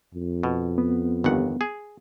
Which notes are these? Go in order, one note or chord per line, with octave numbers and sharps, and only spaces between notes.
F2
B2
B3
G1 D#2 F#5
G#4